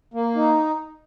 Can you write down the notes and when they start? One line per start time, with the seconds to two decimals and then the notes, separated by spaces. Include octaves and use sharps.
0.14 A#3
0.35 D#4